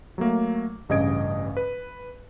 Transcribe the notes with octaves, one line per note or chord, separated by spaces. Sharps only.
F#3 A3 A#3
A1 G2 C#3 D#5 G#6 D7
B4